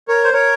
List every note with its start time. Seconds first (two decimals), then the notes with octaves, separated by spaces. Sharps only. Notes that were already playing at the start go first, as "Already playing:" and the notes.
0.08 A#4 C#5
0.24 C5
0.33 A#4 C#5